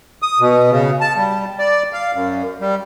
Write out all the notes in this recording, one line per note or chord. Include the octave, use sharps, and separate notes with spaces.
D#6
B2
C#3
A5
G3
D5
F5
F#2
G3